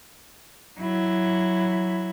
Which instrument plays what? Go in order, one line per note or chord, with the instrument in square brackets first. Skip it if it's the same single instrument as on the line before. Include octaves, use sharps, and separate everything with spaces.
[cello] F#3 E4